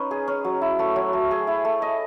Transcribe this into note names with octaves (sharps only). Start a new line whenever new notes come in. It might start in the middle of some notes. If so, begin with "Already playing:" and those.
Already playing: C#4 D#4 B4 C#5
G#4
C#4
F#3
E4
A3
F#3
A3
G#4
E4
A3
D#5